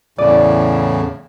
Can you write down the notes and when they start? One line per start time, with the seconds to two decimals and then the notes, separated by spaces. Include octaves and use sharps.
0.18 E2 A2 C#3 D5